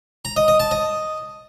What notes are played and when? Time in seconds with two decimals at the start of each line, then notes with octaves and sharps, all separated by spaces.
0.25 A#5
0.36 D#5
0.48 D#5
0.60 A5
0.71 D#5